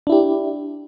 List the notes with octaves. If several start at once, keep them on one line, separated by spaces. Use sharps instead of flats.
D4 E4 G4